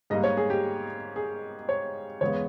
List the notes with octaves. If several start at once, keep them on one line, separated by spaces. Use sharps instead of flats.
G#2 G3 A#3 D#5
C#5
G#4
G4
G#4
C#5
E2 C#3 G#3 B3 C#5